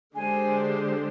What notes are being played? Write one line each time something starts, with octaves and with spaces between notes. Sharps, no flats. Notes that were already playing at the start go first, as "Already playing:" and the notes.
D3 G#3 D4 G4 C5 G#5